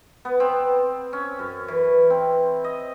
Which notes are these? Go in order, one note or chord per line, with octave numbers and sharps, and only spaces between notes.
B3
C4
C#4
F#2
E3
C4
D#5